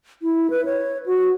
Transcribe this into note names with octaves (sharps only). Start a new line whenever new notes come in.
E4
B4
C#5
F#4